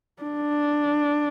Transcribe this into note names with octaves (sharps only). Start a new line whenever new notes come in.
D4